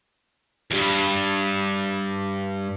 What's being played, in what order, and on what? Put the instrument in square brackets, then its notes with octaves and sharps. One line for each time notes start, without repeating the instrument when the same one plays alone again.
[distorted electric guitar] E2 G2